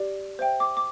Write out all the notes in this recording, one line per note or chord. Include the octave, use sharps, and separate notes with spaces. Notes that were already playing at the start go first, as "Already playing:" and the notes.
Already playing: G4 D5
C5 E5 G5
D6
D6